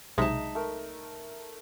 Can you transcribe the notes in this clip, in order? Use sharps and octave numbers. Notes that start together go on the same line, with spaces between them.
B1 C3 G#3 D#4 E5 A5
A3 A#4